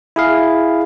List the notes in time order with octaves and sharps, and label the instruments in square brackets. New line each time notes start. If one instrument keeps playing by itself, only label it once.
[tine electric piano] E4 G#4 F5